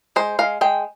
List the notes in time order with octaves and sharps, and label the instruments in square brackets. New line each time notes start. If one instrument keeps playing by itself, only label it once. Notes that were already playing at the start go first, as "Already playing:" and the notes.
[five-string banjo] G#3 C5
G#3 F5
G#3 G5